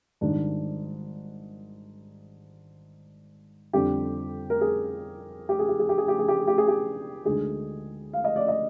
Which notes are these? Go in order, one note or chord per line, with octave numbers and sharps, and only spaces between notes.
G#1 G#2 D#3 G3 D4
F2 D3 G3 G4
A#4
G#4
G4
G#4
G4
G#4
G4
G#4
G4
G#4
G4
G#4
G4
G#4
G4
D2 D3 G#3 D#4 G#4
F5
D#5
D5
D#5